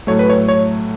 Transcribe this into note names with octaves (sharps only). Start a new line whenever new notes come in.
A2 F#3 A3 C#5
B4
C#5
C#5